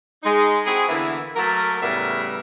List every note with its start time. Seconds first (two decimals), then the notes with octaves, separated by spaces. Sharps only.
0.23 G#3 D#4
0.66 C4 E4 F#4 G#4
0.89 D3 E3 A#3 B3 E4
1.36 F#3 A3 A#3 A#4
1.82 A2 C#3 G3 B3 A#4 E5